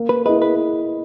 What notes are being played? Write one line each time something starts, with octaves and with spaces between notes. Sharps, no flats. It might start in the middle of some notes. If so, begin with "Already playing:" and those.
Already playing: A#3
B4
E4 G#4 B4 D#5
B4